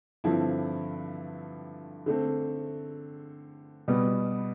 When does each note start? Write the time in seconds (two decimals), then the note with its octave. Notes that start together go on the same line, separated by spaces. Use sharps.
0.24 G2 D3 F3 C4 E4
2.06 D3 A3 C4
3.88 B2 G3 B3